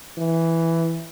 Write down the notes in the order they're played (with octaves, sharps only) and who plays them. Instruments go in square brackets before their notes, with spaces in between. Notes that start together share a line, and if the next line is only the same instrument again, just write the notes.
[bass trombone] E3